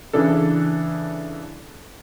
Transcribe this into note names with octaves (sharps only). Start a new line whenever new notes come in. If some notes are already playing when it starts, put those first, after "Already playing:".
C#3 E3 D4 A4